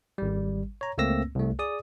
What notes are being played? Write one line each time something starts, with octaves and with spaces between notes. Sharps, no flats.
G#1 G3
C#5 A#5
C#2 A3 A#3 C4 E6 A#6
C2 A3
G#4 D5 D#6